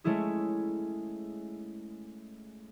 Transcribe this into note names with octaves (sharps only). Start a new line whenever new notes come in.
G#3 A3 C#4 E4 G#4